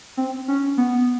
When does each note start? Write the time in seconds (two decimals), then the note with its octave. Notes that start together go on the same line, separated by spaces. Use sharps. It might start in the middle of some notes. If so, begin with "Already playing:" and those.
0.17 C4
0.48 C#4
0.77 B3